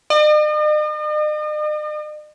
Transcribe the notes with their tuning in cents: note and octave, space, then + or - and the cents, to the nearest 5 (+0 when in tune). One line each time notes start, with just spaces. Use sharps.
D#5 -45